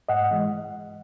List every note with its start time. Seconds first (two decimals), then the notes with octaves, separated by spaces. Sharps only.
0.09 G#2 D#5 F#5
0.31 E3 G#3